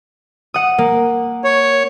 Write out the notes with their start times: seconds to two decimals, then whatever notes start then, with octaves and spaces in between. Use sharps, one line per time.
0.54 F#5 D#6
0.78 A#3
1.44 C#5